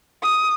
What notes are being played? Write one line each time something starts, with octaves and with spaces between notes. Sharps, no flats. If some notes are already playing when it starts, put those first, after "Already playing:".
D#6